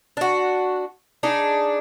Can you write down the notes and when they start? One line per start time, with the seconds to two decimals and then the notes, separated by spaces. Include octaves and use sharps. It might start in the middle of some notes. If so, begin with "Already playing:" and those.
0.17 D4 F#4
1.23 D4 D#4 G#4